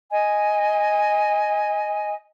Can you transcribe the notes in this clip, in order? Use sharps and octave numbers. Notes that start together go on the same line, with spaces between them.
D#5 G#5